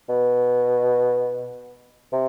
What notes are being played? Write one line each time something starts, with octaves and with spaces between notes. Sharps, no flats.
B2
C3